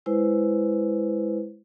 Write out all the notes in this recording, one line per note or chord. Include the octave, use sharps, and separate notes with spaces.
G#3 E4 B4 C5